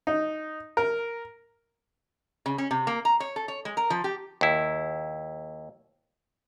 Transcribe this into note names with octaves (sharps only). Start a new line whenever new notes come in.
D#4
A#4
C#3
C#4
C3
A#3
A#5
C#5
A4
C#5
G#3
A#4
F3
G4
D#2 E4